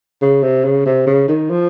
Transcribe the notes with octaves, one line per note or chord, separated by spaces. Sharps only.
C#3
C3
C#3
C3
C#3
D#3
F3